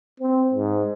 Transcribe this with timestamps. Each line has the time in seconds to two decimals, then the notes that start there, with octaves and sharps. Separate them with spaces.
0.20 C4
0.53 G#2